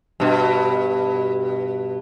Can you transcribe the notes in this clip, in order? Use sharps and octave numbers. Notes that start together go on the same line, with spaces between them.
G2 B2